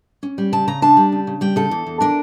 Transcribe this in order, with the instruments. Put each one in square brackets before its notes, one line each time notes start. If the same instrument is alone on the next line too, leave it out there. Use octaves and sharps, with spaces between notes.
[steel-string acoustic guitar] C#4
G3
C#3 A5
C#3 A#5
D4 A5
G3
C#3
C#3
G3 G5
C#3 A4
E2
E2
D4 A#4